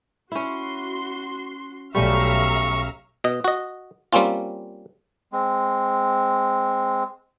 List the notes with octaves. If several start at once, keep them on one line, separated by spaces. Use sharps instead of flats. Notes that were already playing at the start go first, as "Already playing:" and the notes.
C#4 E4 F#4 C6
B1 G3 A3 C#4 E5 F5 A#5 C#6
B2 D#5
F#4 D#5
G3 A#3 C4 C#4 F4
G#3 C4